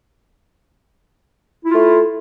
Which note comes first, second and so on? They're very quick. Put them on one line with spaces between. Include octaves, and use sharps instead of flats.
E4 F4 A3